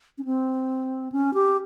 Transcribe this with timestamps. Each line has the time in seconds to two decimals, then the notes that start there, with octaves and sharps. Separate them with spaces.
0.18 C#4
0.25 C4
1.12 C#4
1.34 G4